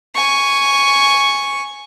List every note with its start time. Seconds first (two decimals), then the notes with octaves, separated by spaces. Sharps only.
0.15 G#5 C#6